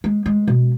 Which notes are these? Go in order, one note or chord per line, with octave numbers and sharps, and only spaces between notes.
G#3
G#3
B2